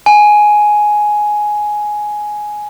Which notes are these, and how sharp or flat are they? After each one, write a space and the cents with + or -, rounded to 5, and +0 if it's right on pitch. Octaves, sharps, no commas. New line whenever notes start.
G#5 +10